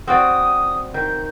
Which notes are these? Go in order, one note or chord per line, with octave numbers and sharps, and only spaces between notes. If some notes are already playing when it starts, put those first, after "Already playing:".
C4 F#4 D5 D#6
D#3 G6